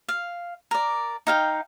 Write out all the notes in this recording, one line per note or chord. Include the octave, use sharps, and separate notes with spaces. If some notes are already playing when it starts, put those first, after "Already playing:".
F5
A#4 D5
D#4 F5 G5